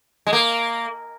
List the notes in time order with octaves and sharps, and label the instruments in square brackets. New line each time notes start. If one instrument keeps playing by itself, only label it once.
[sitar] G#3
A#3